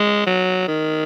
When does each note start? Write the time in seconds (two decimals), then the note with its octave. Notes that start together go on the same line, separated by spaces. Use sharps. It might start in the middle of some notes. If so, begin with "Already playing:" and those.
Already playing: G#3
0.26 F#3
0.68 D#3